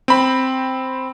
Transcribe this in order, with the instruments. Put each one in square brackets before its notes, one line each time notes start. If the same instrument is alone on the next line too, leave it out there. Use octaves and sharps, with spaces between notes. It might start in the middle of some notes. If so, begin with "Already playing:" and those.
[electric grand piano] C4 B5